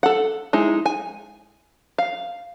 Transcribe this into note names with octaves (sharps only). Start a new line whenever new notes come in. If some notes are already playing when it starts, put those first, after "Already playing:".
A4 F#5
G#3 D#4 E4
G#5
F5